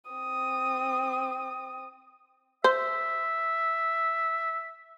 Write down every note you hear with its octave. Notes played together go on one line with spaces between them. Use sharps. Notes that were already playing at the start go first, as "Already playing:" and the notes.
C4 D#6
C5 E5